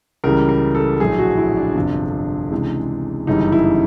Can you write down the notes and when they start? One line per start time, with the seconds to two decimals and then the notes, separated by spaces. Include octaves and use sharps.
0.24 C#2 C#3 E3 G3 A#4
0.49 A#4
0.75 A4
1.00 A#1 A2 F#3 G#4
1.19 F#4
1.37 E4
1.57 D4
1.76 G1 F2 C3 F3
2.51 C#2 C3 E3 G#3
3.27 G1 F#2 C#3 E3 G3 D#4
3.52 E4